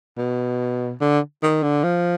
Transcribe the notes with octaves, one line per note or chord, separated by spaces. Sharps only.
B2
D3
D#3
D3
F3